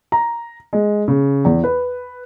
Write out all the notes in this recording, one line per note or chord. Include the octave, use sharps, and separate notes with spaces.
A#5
G#3
C#3
E2
B4